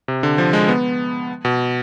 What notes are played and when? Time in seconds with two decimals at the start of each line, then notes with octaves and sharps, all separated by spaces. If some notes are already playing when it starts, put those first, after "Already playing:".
0.08 C3
0.23 D3
0.38 F3
0.53 G#3
0.68 B3
1.45 B2